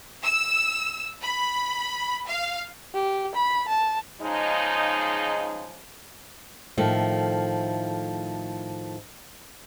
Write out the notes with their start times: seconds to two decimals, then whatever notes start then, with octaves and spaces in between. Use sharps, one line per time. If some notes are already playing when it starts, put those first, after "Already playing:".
0.22 E6
1.22 B5
2.27 F5
2.94 G4
3.35 B5
3.68 A5
4.22 C#3 F3 G#3 D#4
6.77 A2 D#3 F3 A3